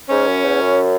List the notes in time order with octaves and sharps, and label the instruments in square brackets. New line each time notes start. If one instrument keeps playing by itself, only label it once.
[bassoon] G#2 [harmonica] C#4
[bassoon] F#2
E2
F#2